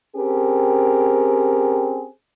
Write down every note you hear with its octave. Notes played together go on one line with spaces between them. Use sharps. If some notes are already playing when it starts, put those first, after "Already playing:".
C4 C#4 G4 G#4 A#4